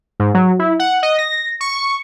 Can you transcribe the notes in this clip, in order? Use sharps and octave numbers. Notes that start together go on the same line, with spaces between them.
G#2
F#3
E4
F#5
D#5
A#6
C#6